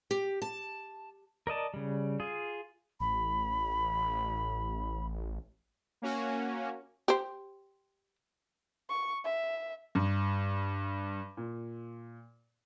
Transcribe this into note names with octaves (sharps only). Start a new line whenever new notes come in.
G4
A5
A#4 D5 D#5 A5
C#3 G3
F4 G#4
A1 B5
A#3 C#4 F#4
G4 C5
C#6
E5
G2
A#2